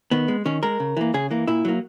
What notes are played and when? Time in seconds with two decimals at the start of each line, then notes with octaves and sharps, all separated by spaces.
0.11 D#3 B3
0.28 G#3
0.45 D#3 C#4
0.63 G#3 A#4
0.80 C#3
0.97 E3 A#3
1.14 C#3 G#4
1.31 E3 A#3
1.48 A#2 E4
1.65 F#3 A#3